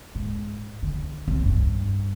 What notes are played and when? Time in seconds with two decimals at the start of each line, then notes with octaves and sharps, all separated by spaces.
0.15 G#2
0.82 D3
1.28 C2 D#3
1.45 G2